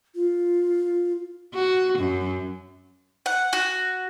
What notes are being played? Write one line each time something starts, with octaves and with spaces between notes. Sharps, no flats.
F4
F#4
F#2
F#5
F#4